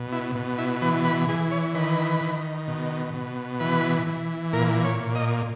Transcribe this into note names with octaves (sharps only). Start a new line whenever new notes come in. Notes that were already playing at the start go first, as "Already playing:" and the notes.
Already playing: B2
E4
B2
E4
E3 B4
B4
E3 G#4
C#5
D#3 B4
D#3
B2
B2
E3 B4
E3
A#2 A#4
C#5
A#2
D#5